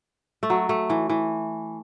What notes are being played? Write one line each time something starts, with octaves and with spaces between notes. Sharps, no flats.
A3
F#3
A3
E3
E3